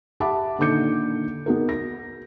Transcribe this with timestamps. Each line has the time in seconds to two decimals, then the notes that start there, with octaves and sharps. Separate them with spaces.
0.20 G4 E5 F#5 A5 B5 D6
0.58 A#2 D3 D#3 D6 G6 C#7
1.46 B3 D#4 F#4 G#4 A#4
1.69 A#6